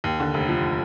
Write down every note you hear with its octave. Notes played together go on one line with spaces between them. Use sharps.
D#2
D3
F1
F3